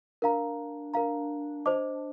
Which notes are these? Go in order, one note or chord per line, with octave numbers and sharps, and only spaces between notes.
D4 A#4 F5 A#5
A#4 F5 A#5
C5 D#5 A5 D6